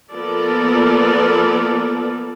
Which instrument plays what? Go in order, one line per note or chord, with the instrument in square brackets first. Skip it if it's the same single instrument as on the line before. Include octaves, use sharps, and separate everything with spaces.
[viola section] F3 A#3 B3 A4 A#4 D5